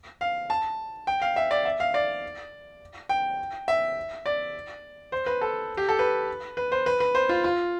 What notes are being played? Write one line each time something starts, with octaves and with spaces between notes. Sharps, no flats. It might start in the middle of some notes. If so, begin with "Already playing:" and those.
F5
A5
G5
F5
E5
D5
E5
F5
D5
G5
E5
D5
C5
B4
A4
G4
A4
B4
B4
C5
B4
B4
C5
F4
F4